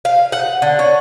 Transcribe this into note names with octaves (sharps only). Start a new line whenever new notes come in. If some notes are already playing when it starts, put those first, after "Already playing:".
F5
F#5
D3
C#5